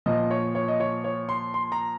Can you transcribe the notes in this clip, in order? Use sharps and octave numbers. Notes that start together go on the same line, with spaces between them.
A#2 F3 D#5
C#5
C#5
D#5
C#5
C#5
C6
C6
A#5